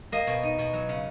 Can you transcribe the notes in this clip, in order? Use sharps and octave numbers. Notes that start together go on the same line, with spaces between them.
A#3 D#5
B2
D#4
B2
F#3
C#3